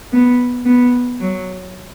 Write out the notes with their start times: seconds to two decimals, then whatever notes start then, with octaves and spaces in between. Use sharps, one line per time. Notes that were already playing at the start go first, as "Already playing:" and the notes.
0.13 B3
0.66 B3
1.20 F#3